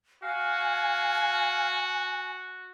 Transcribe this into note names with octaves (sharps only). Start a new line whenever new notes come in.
F#4 F5 G#5